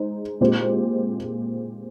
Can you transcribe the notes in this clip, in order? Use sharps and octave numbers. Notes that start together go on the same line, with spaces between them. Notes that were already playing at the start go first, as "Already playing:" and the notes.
Already playing: G#3 D#4 G#4 C5
A#2 G#3 C4 G4 C5